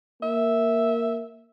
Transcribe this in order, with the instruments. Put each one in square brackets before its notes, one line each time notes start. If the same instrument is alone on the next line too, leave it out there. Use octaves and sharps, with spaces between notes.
[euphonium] A#3 [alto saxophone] E5